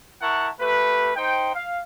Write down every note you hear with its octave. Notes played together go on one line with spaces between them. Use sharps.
E4 A#4 F#5 A5 C#6
A3 G4 B4
D#4 C5 G5
F5